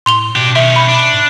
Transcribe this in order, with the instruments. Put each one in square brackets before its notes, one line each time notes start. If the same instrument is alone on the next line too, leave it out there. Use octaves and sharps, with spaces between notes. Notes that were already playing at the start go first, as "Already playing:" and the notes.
[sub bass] A2 [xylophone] C6 F7 G7
[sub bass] B2 [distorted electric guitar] D4 G4
[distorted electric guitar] D#3 C#4 [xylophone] E5
[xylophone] B5
[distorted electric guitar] D4
[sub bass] G#2